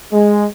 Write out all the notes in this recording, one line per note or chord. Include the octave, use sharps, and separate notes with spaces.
G#3